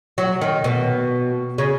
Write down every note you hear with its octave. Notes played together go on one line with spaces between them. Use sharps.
F#3
D#3
B2
C#3